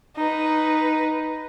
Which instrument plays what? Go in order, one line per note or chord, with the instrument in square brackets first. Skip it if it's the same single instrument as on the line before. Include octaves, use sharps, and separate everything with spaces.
[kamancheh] D#4 B4